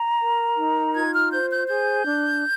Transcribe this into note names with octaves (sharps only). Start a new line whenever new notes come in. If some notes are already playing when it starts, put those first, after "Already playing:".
Already playing: A#5
A#4
D#4
F4 G#6
F6
C5 G6
G6
G#4 G6
D4